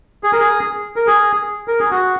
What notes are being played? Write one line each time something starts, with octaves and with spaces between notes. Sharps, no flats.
G#4
A#4
G#4
A#4
G#4
A#4
G#4
F#4